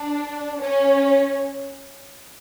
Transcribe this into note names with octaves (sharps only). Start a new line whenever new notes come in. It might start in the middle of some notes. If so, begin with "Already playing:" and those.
Already playing: D4
C#4